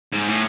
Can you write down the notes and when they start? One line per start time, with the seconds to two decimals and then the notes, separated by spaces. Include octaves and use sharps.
0.12 G#2
0.27 A2